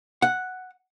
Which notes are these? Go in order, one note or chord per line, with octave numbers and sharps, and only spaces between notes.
F#5